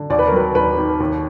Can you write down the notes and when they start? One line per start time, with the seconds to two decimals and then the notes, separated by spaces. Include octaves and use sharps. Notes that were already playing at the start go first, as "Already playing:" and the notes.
Already playing: D3
0.10 D#2 D5
0.19 B4
0.27 A#4
0.32 F#3 B4
0.55 D#2 B4
0.77 D#3
1.00 D#2